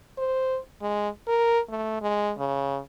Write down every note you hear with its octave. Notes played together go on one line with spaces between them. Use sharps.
C5
G#3
A#4
A3
G#3
C#3